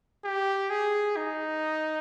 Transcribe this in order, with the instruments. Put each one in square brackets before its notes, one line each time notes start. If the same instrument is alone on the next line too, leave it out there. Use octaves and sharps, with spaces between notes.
[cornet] G4
G#4
D#4